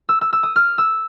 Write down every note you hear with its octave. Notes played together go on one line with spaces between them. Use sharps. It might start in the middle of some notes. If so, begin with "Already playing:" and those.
E6
E6
E6
D#6
F6
E6